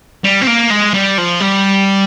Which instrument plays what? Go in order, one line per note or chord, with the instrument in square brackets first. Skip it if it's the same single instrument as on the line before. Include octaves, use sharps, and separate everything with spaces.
[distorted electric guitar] G3
C4
A#3
G#3
G3
F3
G3